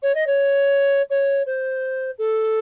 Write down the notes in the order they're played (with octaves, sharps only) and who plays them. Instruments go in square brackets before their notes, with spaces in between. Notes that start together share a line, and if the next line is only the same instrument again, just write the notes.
[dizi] C#5
D#5
C#5
C#5
C5
A4